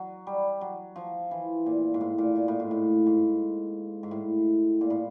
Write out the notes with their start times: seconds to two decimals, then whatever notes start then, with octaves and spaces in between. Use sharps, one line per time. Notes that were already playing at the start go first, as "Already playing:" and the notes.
Already playing: F#3
0.27 G3
0.61 F#3
0.96 F3
1.31 E3
1.66 A#2
1.94 G#2
2.01 A2
2.18 A#2
2.35 A#2
2.48 A2
2.60 G#2
2.71 A2
3.06 G#2
4.03 G#2
4.11 A2
4.81 A#2
4.90 A2